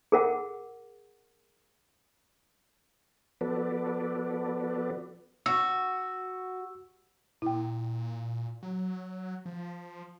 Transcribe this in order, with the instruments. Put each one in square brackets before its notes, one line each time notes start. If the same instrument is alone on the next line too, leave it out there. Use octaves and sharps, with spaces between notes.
[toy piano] G#4 A#4 F#5
[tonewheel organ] F3 B3 F#4 A4 B4 D5
[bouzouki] F#4 [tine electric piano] E6
[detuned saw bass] A#2 [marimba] E4 G5
[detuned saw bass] F#3
F3